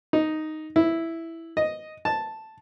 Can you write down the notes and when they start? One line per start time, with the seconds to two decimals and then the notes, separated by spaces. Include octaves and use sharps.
0.13 D#4
0.76 E4
1.57 D#5
2.05 A5